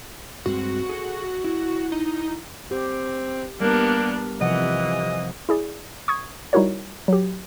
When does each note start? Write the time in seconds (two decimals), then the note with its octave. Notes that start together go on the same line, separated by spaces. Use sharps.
0.46 G2 G#3 C4 F#4
0.89 G#4 A4
1.44 E4
1.92 D#4
2.71 C4 G4
3.60 G3 A#3 B3 D4 A#4
4.41 C3 E3 F3 D#5 F#5
5.49 E4 G#4 D5
6.08 C#6 D#6 G#6
6.53 G3 D#4 E4 F#4 A#4 C#5
7.08 F#3 G4